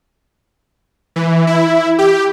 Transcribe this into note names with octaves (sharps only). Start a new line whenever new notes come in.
E3
E4
G4